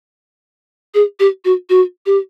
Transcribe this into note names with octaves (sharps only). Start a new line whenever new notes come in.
G#4
G4
F#4
F#4
G4